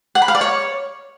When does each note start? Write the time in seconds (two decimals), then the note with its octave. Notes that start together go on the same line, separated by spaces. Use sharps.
0.15 F#5
0.22 B5
0.28 F5
0.35 D5
0.41 C#5